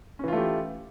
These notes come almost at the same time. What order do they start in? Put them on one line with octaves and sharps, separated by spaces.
C#4 E3 F4 A3 G4